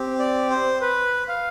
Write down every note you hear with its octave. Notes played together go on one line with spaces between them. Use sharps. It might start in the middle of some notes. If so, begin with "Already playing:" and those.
Already playing: C4 G4
D5
C5
B4
F5